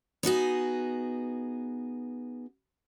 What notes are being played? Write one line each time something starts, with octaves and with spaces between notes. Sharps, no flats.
B3 D#4 F#4 G#4